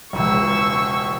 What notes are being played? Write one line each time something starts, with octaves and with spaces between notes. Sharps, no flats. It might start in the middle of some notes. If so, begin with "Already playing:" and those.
E1 C#2 C#6 E6